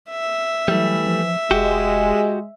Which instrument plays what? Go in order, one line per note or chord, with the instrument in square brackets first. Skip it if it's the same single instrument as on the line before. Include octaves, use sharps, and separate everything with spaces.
[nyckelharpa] E5
[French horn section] E3 [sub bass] F#3 [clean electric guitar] G3 A3
[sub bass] F3
[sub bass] F1 [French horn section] G#3 [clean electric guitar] F#4 G4